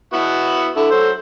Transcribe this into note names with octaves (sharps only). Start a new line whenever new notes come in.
B3 E4 F#4
D3 E4 A4
F#3 C5